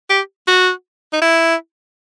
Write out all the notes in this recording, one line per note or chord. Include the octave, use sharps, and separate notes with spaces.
G4
F#4
D#4
E4